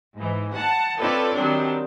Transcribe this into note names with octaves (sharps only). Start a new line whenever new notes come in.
G#2 E3
F#5 A5
C4 F4 A4 B4 C#5 D5
D#3 F#3 G3 C4 D4